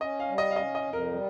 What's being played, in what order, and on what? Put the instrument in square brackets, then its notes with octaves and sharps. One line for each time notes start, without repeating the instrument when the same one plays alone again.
[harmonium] C#4 [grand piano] D#5
[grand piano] F5
[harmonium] G3
[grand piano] D#5
F5
[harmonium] C#4 [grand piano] D#5
[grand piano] D#5
[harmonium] F2
[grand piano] A#4
[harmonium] G3